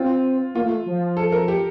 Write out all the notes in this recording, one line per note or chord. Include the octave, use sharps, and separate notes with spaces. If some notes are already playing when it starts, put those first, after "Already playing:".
Already playing: C4 F4
A#3 F4
A3
F3
A4
A#4
G4